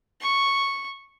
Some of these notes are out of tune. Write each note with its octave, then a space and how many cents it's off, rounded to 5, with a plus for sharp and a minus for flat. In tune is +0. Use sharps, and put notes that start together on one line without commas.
C#6 -5